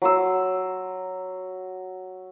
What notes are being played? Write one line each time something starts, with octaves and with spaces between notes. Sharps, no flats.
F#3 C6 E6